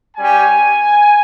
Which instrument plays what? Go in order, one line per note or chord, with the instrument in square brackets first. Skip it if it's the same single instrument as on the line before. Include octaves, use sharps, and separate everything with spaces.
[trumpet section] G3 C#4 G4 G#5